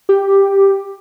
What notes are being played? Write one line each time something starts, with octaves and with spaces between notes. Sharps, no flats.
G4